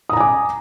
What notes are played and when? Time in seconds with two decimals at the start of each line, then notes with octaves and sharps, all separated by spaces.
0.09 D#6
0.13 A#5
0.17 G#5
0.20 D6